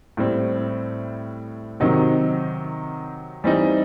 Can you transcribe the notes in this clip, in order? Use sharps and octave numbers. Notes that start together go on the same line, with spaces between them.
A2 G3 C4
C3 D#3 F#3 C4 D#4
E3 G3 C4 D#4